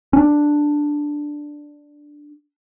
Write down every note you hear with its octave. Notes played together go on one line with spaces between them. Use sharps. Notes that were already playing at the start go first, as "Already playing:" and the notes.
C#4 D4